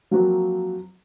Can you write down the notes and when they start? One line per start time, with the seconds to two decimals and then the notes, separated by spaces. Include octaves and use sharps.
0.11 F3 F#3 A#3 C4 F#4